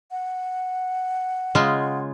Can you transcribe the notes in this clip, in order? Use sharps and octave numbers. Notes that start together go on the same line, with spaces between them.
F#5
C#3 G#3 F4